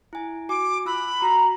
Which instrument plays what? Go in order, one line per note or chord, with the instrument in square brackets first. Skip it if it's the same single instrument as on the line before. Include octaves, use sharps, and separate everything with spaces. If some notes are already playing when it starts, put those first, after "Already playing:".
[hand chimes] E4 G#5
[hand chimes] F#4 G#5 [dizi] D6
[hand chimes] F4 E6 F#6 [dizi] B5
[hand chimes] F#4 [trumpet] A#5